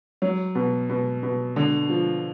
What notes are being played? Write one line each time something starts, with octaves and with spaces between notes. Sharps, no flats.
F#3
B2
B2
B2
D3
F3